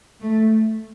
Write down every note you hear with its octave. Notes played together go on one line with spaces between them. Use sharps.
A3